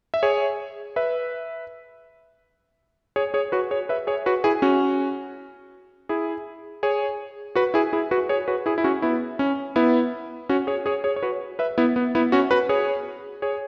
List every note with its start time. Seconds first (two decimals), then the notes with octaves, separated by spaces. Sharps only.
0.14 E5
0.23 G#4 C#5
0.96 B4 E5
3.16 G#4 C#5
3.34 G#4 C#5
3.52 F#4 B4
3.71 G#4 C#5
3.89 B4 E5
4.07 G#4 C#5
4.26 F#4 B4
4.44 E4 G#4
4.62 C#4 F#4
6.09 E4 G#4
6.83 G#4 C#5
7.55 F#4 B4
7.74 E4 G#4
7.93 E4 G#4
8.11 F#4 B4
8.29 G#4 C#5
8.48 F#4 B4
8.66 E4 G#4
8.78 E4
8.84 C#4 F#4
9.02 B3 E4
9.39 C#4
9.76 B3 E4
10.49 C#4 F#4
10.67 G#4 C#5
10.86 G#4 C#5
11.04 G#4 C#5
11.16 C#5
11.23 F#4 B4
11.59 B4 E5
11.78 B3 E4
11.96 B3
12.15 B3 E4
12.32 C#4 F#4
12.51 F#4 B4
12.69 G#4 C#5
13.42 G#4 C#5